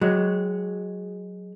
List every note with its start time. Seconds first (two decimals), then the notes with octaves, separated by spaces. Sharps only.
0.01 F#3 G#3